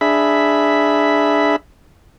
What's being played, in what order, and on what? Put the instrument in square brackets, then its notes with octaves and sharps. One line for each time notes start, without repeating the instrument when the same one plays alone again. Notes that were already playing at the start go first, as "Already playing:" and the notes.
[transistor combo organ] D4 G#4 E5 B5